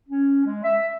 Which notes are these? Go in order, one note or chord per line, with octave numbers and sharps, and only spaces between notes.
C#4
G#3
E5